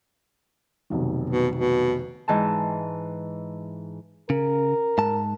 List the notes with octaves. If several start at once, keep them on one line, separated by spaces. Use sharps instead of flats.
F1 B1 D#3
B2
B2
G#2 E3 A5
C#3 A#4
G#2 A5